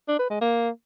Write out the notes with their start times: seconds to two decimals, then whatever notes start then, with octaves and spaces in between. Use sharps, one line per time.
0.08 D4
0.19 B4
0.30 G#3
0.41 A#3